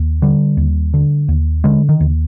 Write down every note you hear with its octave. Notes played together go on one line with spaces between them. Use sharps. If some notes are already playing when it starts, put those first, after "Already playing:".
Already playing: D#2
D3 G3
D#2
D3
D#2
D3 G#3
D#3
D#2